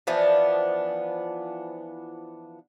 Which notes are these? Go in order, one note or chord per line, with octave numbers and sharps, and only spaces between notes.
E3 F3 B3 D4